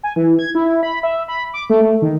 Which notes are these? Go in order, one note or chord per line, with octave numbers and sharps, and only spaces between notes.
G#5
E3
G#6
E4
B5
E5
B5
D6
A3
A3
D#3